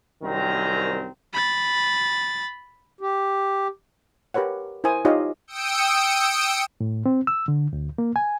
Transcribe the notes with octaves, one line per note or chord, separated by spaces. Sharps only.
C2 F#2 D#3 C4 A#5
B5 A6
G4
G4 A#4 B4 C#5 F#5
E4 A#4 C5 G#5 D#6
D#4 F4 G4 C#5 D#5 F5
G5 D#6 E6 C#7 D7
A2
C4
E6
D3
D2
A#3
G#5